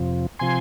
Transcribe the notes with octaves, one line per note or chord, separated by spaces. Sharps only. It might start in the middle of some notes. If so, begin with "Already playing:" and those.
Already playing: F2 C3 F3
C3 F3 G#5 C6